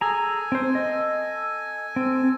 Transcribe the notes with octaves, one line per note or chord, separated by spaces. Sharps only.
G#4 A4 G#5 A#5
C4 C5
D#5
C4